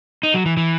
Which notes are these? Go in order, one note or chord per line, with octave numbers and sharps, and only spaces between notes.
D#4
F#3
E3
E3